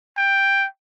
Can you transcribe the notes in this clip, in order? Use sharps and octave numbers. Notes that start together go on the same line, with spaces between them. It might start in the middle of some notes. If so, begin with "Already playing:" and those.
G5